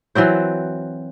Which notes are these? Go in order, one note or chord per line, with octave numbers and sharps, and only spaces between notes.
E3 F#3 C4 C5